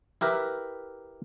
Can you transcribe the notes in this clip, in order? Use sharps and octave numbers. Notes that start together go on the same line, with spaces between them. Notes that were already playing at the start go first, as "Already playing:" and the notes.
E4 G4 A#4 B4 E5